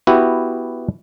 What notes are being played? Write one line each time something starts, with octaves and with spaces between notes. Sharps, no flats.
B3 E4 F#4 G4